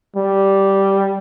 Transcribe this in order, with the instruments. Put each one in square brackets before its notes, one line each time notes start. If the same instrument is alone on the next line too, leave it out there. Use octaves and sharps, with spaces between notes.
[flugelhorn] G3